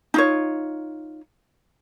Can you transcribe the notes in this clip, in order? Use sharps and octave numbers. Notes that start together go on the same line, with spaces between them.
D#4 F4 C#5